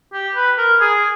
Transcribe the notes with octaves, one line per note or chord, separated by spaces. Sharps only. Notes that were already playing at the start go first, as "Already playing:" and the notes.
G4
B4
A#4
G#4